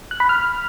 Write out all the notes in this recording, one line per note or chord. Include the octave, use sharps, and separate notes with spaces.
F#6
B5
F6